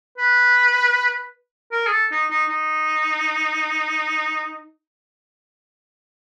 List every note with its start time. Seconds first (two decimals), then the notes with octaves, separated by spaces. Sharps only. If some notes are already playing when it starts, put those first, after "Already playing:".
0.18 B4
1.72 A#4
1.86 G#4
1.92 A4
2.11 D#4
2.30 D#4
2.49 D#4